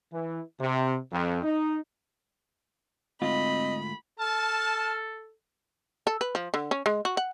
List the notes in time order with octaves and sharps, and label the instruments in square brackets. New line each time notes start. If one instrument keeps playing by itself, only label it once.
[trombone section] E3
C3
F2
D#4
[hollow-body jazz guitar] D2 G#2 F4 [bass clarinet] C4 [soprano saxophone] D#5 [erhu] B5
[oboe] A4 [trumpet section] A5 [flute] F6
[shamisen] A4
B4
F3
D3
C#4
G#3
F#4
F#5